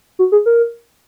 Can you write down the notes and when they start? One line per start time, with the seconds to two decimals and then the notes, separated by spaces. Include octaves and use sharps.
0.19 F#4
0.32 G#4
0.46 A#4